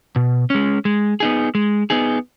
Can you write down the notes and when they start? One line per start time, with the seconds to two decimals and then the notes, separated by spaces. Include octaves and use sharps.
0.16 B2
0.50 G#3 C#4
0.85 G#3
1.20 B3 D#4 G#4
1.55 G#3
1.90 B3 D#4 G#4